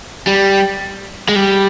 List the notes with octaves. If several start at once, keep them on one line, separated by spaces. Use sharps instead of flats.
G3
G#3
G3